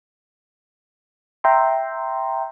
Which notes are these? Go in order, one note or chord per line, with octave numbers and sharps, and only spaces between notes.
E5 G5 A#5 C6